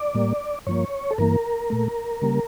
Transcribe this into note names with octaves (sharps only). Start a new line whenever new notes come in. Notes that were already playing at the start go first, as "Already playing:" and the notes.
Already playing: D5
A2 G3 A#3
G2 F3 A#3 C#5
A4
G2 E3 A#3 A#4
A#2 A3
C#3 G3 A#3